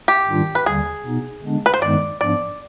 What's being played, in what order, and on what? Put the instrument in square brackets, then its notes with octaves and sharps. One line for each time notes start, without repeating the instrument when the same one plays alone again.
[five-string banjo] G4
[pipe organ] G#2 D#3 G3 D4 F4
[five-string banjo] B4
[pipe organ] D#2 D3 G3 [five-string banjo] G#4
[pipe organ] B2 B3 D#4
D3 G#3 B3 D4
[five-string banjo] B4
C5
[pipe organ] G2 D#3 G#3 B3 D#4 [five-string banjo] D5
[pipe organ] G#2 F3 B3 D4 [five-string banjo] D5